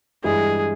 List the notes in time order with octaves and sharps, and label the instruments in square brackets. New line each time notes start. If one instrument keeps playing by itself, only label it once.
[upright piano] G2 E3 G#3 [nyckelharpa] G#4